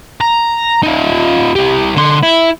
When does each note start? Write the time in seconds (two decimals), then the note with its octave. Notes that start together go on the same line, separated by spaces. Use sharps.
0.21 A#5
0.83 D#4 F4
1.55 C2 G4
1.96 D3 C6
2.23 E4